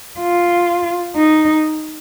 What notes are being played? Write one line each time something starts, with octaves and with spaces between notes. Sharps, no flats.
F4
D#4